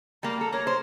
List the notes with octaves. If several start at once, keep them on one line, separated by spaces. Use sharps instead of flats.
G3 A#3 A#5
A4
A#3 A#4 C#5
C5